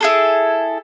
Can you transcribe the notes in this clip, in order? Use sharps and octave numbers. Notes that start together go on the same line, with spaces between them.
E4 G#4 A4